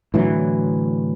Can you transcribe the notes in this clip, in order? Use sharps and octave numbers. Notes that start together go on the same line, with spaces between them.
A2 D3 E3 F#3